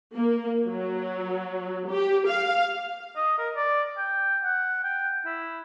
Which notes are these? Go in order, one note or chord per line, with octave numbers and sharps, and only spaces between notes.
A#3
F#3
G4
F5
D#5
A#4
D5
G5
F#5
G5
E4